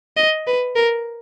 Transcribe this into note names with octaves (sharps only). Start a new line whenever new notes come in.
D#5
B4
A#4